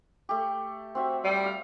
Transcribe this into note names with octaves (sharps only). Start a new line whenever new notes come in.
A3 G4
C4 F#4 E5
G3
G4 F5